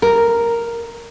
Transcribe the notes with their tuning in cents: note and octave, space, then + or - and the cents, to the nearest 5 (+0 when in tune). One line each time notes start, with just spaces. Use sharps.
A#4 +0